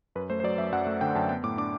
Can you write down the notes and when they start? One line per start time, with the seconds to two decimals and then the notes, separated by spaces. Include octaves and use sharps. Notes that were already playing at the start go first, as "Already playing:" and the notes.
0.15 F#2 B4
0.30 A3 C5
0.40 C5
0.44 F#3 D5
0.58 F#2 E5
0.72 F#2 F#5
0.87 A3
1.01 D3 G5
1.15 F#2 A5
1.29 B3 G5
1.44 A2 D6
1.58 D4 D6